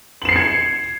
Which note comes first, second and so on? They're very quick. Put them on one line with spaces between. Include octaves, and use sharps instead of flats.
F#7 E7 C7 C#7 G#6